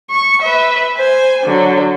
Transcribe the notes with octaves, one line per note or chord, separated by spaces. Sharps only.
C#6
B4 E5
C5 G#5
D3 F#3